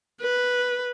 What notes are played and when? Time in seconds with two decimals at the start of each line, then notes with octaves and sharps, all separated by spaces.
0.21 B4